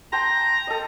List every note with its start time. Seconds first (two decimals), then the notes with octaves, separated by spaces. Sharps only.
0.12 G5 A5 A#5 C6
0.67 A4 D#5